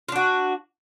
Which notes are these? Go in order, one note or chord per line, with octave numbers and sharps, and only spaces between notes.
D4 F4 F#4